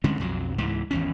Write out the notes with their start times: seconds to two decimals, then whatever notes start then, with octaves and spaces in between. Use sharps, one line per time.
0.04 D3 G#3 C4 C#4
0.20 B1 F2 F#3
0.58 C#2 G#2 E3
0.91 G#1 E2 C#4